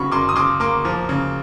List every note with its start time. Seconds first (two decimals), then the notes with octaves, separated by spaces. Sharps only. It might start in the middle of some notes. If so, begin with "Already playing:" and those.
Already playing: C#3 F#3 B5 C#6
0.12 F#2 C6 D6
0.29 D#6
0.36 C#3 C6 D6
0.60 A#3 C6 D6
0.85 F3
1.09 C#3